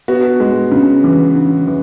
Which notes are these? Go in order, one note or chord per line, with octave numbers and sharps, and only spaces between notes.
B3 F#4
G#3
C#3
E3
C#3
E3